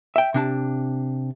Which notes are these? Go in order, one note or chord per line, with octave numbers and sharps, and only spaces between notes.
E5 G5
C3 D4 A5